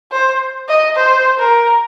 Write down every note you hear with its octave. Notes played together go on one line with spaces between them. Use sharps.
C5
D#5
C5
A#4